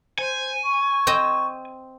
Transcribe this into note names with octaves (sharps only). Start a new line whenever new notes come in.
C5 G#5
C#6
C4 D#5 G5